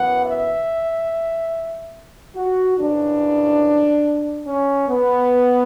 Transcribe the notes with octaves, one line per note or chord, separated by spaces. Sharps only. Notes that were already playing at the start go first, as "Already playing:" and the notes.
Already playing: F#2 E3 B3 F#5
E5
F#4
F#2 C#3 E3 D4
C#4
B3